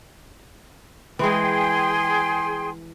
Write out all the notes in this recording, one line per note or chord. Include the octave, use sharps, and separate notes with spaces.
E3 G#3 G#4 G5 C6